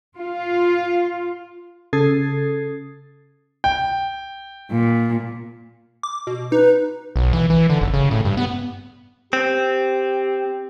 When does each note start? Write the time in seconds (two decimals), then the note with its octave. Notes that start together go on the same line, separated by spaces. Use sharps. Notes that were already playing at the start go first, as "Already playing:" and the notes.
0.17 F4
1.93 C#3 A4 D#6 G#6 A6 C7
3.64 G5
4.71 A#2
6.03 D6
6.27 B2
6.52 D#4 B4
7.16 B1
7.33 E3
7.50 E3
7.70 D3
7.81 F#1
7.93 C#3
8.11 A2
8.25 G2
8.37 B3
9.33 C4 G4